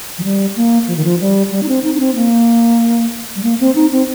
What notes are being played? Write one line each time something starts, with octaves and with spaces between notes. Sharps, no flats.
F3
G3
A#3
F3
D#3
F3
G3
G3
D#4
C4
D#4
D#4
C4
A#3
G3
A#3
C4
D#4
C4